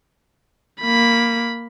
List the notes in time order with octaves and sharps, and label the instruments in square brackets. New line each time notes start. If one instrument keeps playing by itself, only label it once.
[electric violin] A#3 B5